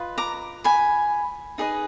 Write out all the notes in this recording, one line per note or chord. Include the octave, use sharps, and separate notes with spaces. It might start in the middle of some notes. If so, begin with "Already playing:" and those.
Already playing: F4 B4 D#5
A#5 D6
G#5 B5
D#4 G#4 B4 D#5